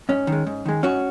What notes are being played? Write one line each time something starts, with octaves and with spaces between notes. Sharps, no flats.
G#2 C#4
D#3
G#3
G#2
D#3 G#3
G#2 C#4 F#4